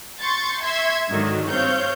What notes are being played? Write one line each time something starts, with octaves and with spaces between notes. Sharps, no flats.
C6 C#6 G6 A6
E5 C6 C#6 G#6
G#2 D3 D#3 F#3
G2 C4 C#5 F5 G6